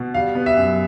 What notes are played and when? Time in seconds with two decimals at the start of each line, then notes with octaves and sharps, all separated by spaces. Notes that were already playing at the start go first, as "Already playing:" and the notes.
Already playing: B2
0.14 G3 F5
0.35 B3
0.46 E5
0.57 F#2